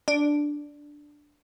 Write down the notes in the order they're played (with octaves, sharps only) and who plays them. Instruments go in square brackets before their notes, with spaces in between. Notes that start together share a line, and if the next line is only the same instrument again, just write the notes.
[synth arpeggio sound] D4